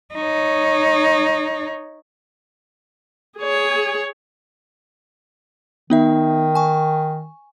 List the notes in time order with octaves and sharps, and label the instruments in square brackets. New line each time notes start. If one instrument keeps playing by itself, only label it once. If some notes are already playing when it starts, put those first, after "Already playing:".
[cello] D#4 C#5
[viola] G#4 C#5
[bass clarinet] D#3 [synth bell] B3 D#4 E5
[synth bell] G#5 C#6